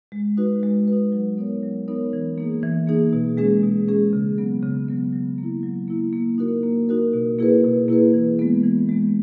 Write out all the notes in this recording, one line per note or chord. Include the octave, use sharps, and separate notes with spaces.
G#3
D#4 F#4 B4
G#3
D#4 F#4 B4
F#3
B3 D#4 A#4 C#5
F#3
B3 D#4 A#4 C#5
E3
A#3 D#4 G#4
E3
A#3 D#4 G#4
B2
G#3 C#4 G#4
B2
G#3 C#4 G#4
C#3
F#3 B3
C#3
F#3 B3
F#3
A#3
E4
F#3
A#3 E4
A#3
D#4 F#4 A#4
A#3
D#4 F#4 A#4
B2
A#3 E4 G#4 B4
B2
A#3 E4 G#4 B4
E3
G#3 B3
E3
G#3 B3